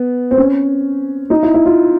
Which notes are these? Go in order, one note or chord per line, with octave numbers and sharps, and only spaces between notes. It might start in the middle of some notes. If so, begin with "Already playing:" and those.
Already playing: B3
C4
C#4
D#4
E4
E4
F4